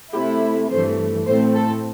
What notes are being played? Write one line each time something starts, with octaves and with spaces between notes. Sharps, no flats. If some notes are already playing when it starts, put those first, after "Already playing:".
C3 A3 E4 G4
G2 E3 A3 C5
A2 A3 C4 C5
A4